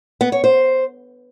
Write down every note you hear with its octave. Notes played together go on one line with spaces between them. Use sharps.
B3
C#5
C5